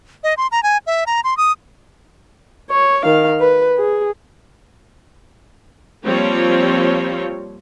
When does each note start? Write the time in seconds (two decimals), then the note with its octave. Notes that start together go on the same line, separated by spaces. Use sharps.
0.24 D#5
0.37 C6
0.52 A#5
0.63 G#5
0.87 E5
1.07 A#5
1.24 C6
1.37 D#6
2.70 C#5
3.04 D#3 F5
3.40 B4
3.78 G#4
6.06 F3 G3 A#3 C4 F4 C#5